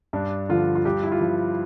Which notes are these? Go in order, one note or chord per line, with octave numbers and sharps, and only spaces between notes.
G2 D4
D3 F3 F4
F4
G2 G4
E4
F4
F3 G4